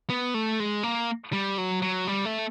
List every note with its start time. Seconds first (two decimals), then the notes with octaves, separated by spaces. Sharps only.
0.10 B3
0.34 A3
0.60 G#3
0.83 A#3
1.33 G3
1.58 F#3
1.82 F#3
2.07 G3
2.25 A3